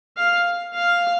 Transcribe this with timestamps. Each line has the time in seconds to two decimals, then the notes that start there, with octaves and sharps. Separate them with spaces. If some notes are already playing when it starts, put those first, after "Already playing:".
0.17 F5
0.74 F5